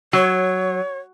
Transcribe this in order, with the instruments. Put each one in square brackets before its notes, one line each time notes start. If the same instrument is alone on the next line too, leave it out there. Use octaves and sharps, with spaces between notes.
[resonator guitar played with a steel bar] F#3 [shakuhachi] C#5